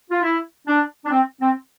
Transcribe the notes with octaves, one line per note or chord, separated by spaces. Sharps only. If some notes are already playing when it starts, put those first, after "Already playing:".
F4
E4
D4
D4
C4
C4